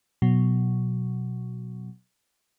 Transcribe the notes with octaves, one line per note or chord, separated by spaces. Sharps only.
B2 F#3